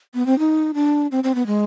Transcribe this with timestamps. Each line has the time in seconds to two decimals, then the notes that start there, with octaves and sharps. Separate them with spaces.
0.14 B3
0.26 C4
0.39 D#4
0.74 D4
1.12 C4
1.24 C4
1.35 B3
1.47 G#3